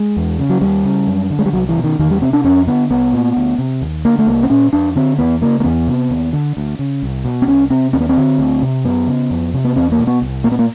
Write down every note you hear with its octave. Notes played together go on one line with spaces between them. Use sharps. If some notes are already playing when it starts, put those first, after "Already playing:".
Already playing: G#3
E2
C#3
F#3
D#2 G3
C#3
F#2
D3
G#3
G3
C2 F#3
E3
B2
D#3
E2 D#3
G3
C3 C4
D4
F2 C#4
D3 B3
C2 B3
A#2
D2
C3
D#2
D3 A#3
A3
C2 A#3
C4
A#2 C#4
F2 D4
D3 C4
E2 B3
C#3 A#3
A#3
E2 B3
C3
D#2
D3
D2
C#3
C2
B2
C4
C2 C#4
C3 C4
D#2 C4
B3
C4
D3
D2
C3
F#2 B3
C#3
F2
C3
B3
E2 C4
A#3
B2
B3
C2
A#2 A#3
B3
A#3